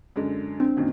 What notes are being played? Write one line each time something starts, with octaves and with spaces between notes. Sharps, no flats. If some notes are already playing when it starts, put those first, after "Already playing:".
F#2 D3 G#3
C4 D4
F#2 A#2 D#3